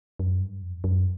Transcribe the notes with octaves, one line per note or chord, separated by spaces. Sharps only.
F#2
G2
F2
F#2